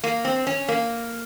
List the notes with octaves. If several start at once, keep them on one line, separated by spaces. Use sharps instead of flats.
A#3
C4
C#4
A#3